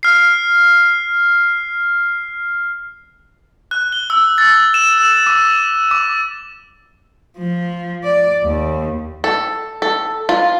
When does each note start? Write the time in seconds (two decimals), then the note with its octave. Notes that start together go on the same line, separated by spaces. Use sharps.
0.03 F6 C7
3.71 F#6
3.92 G7
4.10 E6
4.38 A6
4.74 E7
4.98 E6
5.26 D6
5.91 D6
7.38 F3
8.04 D5
8.44 D#2
9.24 A4
9.82 A4
10.29 F4